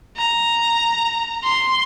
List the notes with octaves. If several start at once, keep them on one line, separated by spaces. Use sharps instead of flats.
A#5
C6